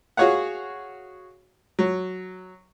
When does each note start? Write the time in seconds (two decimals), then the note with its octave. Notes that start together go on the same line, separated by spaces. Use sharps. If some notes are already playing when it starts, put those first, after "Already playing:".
0.17 F#4 G#4 C#5 F5 F#5
1.79 F#3